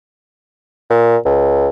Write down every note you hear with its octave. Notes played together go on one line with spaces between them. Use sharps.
A#2
C#2